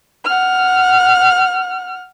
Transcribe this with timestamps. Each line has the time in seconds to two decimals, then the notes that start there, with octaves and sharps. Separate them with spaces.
0.25 F#5 F6